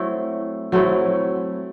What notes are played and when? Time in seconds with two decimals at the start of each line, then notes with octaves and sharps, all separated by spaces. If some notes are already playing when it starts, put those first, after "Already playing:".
Already playing: F#3 A3 C4 E4
0.72 F#3 A3 C4 E4